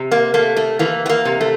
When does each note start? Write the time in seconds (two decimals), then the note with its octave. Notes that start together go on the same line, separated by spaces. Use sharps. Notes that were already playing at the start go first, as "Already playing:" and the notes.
Already playing: C3
0.11 A#3
0.34 A3 A#3
0.56 A3
0.79 E3 A#3
1.06 B3
1.09 A#3
1.25 C3
1.41 A3